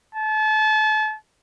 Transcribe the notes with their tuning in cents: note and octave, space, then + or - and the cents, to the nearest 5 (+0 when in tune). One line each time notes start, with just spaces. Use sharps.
A5 -35